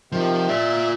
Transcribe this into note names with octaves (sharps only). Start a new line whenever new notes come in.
C3 D#3 F3
F4 D5 E5